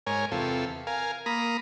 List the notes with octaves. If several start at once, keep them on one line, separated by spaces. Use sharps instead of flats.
G#2 A#4 C#5 G#5
E2 C3 F4 A4
A#4 F5 G#5
A#3 A#5 B5 D#6